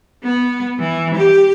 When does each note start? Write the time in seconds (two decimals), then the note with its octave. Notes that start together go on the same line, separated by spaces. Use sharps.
0.24 B3
0.79 E3
1.14 G4